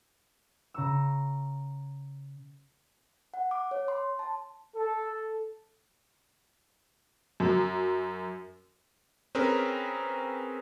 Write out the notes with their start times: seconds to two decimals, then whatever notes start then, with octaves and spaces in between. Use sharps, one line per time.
0.74 C#3 A#5 C#6 E6
3.34 F#5
3.51 D6
3.71 C#5
3.88 C6
4.19 A5
4.75 A4
7.40 F#2
9.35 C4 C#4 G#4 A#4 B4